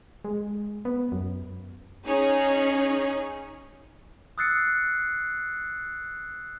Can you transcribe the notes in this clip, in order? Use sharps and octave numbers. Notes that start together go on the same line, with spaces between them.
G#3
B3
F#2
C#4 D#4 G#4 C#5
D#6 E6 F#6 A6 C7 C#7